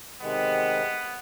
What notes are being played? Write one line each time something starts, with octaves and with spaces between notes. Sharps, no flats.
C3 D#3 G#3 B3